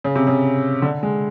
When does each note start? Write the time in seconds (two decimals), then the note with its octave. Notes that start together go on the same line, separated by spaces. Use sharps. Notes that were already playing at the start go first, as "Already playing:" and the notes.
0.04 C#3
0.15 C3
0.27 C#3
0.82 D3
1.03 G#3